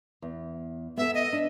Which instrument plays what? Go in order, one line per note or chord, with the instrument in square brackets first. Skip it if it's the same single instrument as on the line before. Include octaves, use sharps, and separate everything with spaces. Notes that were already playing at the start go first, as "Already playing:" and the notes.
[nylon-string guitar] E2
[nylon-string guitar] B3 A4 [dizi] E5
[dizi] D#5
[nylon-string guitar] D4